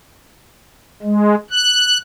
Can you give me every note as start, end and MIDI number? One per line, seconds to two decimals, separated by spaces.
1.02 1.35 56
1.51 1.97 90